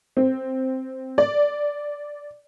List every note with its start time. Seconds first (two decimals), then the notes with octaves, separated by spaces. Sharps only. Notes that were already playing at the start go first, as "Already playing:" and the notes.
0.17 C4
1.18 D5